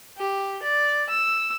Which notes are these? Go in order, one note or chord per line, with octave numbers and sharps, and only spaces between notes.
G4
D5
E6